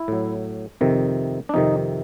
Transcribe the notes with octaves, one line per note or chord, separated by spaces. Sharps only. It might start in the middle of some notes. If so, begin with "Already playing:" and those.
Already playing: E4
A2 F#3
F2 C3 D#3
D4
F2 C3 D#3 D#4